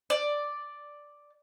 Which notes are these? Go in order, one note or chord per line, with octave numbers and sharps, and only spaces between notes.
D5